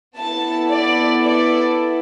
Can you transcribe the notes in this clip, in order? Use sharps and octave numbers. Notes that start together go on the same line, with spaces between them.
B3 E4 A4 A5
D5
D5